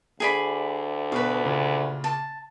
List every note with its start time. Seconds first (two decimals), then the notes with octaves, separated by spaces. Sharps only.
0.20 D2 G#4 D5 B5
1.12 B2 B4 F5
1.43 A#2 C#3
2.04 A5